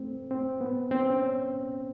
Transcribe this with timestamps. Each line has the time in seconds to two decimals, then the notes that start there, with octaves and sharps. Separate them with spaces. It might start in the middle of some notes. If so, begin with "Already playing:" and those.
Already playing: A3 C4
0.31 C4
0.61 B3
0.91 C4
1.10 C#4